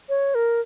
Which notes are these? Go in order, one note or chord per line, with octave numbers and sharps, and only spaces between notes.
C#5
A#4